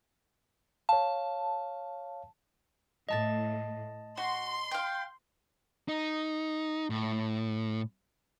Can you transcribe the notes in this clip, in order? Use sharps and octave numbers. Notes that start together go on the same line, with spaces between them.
C#5 F5 A5
A2 D#5 A5 A6
F#4 C6
F5 G5
D#4
A2